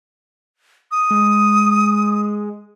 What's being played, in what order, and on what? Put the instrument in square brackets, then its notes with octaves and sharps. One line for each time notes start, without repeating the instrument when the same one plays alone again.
[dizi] D#6
[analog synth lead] G#3